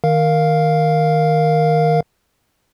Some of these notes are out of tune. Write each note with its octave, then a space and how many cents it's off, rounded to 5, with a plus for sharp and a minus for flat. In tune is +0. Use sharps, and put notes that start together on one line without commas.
D#3 +0 A#4 +0 F5 +0